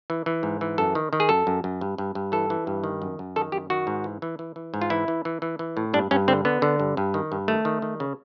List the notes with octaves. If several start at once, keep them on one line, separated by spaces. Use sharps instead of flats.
E3
E3
G#2
E3
F#2 A4
D#3
D#3
G#4
F#2 A4
F#2
F#2
G2
G2
G2
E3 A4
E3
G2
D#3
F#2
F#2
D#3 A4
F#2 G4
D#3 F#4
G#2
E3
E3
E3
E3
G#2
F4
E3 E4
E3
E3
E3
E3
A2
G2 D4
G2 C#4
D3 C4
D3 B3
D3
G2
G2
D#3
G2
D#3 A3
D#3
D#3
C#3